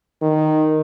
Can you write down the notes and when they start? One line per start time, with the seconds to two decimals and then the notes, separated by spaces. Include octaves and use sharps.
0.22 D#3